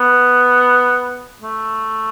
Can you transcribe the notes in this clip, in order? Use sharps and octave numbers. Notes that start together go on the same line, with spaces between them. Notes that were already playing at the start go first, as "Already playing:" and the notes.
Already playing: B3
A3